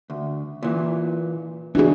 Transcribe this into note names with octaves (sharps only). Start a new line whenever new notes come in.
D2
A#2 E3
B2 E3 D4 F#4 G#4